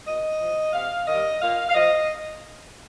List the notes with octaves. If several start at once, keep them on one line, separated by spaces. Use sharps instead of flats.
A#2 D#5
F3
C3 F5
D#3 G3 D#5
A#2 F5
F5
F3 D#5